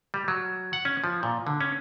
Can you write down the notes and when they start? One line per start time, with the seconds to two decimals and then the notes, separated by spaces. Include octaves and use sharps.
0.14 G3
0.28 F#3
0.73 F#5
0.85 C#4
1.04 F3
1.23 A#2
1.47 D3
1.61 C#4